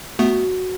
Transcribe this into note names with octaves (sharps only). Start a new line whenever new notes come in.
A3 B3 F#4